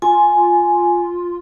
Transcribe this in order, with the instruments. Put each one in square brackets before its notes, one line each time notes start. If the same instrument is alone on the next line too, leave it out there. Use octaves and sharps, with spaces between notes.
[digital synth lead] F4 [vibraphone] G#5